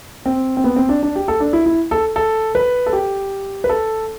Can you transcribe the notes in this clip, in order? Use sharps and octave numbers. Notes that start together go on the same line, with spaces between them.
C4
C4
B3
C4
D4
D4
G4
A4
D4
E4
E4
A4
A4
B4
A4
G4
B4
A4